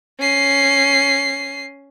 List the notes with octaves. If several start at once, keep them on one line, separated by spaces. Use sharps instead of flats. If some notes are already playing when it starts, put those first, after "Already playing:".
C#4 C7